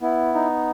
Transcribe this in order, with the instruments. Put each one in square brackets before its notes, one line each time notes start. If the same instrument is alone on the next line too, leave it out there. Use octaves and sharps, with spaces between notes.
[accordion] B3 E4
D#4